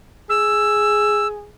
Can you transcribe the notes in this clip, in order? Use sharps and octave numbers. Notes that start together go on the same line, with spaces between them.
G#4 E6